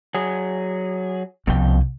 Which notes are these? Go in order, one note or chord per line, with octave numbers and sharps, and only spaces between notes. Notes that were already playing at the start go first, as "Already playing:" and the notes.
F#3 G#4
C2 B2 F3 C#4 G5